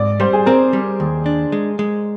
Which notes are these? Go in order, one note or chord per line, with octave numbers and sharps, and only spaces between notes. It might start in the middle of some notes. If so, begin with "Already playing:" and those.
Already playing: G#2 D5
G3 C5
G#4
C4 A#4
G3
D#2
D4
G#3
G#3